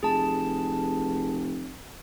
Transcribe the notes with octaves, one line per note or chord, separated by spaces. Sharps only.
F1 G#4 A5